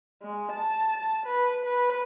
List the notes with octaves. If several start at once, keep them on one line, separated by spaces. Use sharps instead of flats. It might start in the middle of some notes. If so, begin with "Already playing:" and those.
G#3
A5
B4
B4